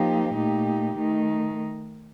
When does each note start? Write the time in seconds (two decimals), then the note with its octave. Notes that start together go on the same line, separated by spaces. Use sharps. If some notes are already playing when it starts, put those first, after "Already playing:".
Already playing: F3 A#3 D#4 G4
0.34 A#2 A3 D#4 G4
0.97 D#3 A3 D#4